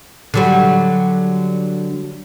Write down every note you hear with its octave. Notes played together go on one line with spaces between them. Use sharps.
D3 F#3 G3